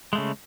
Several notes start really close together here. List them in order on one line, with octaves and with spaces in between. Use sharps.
G#3 A3 C#3